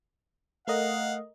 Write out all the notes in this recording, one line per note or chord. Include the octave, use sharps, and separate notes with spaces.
A3 A#4 D#5 F5 F#5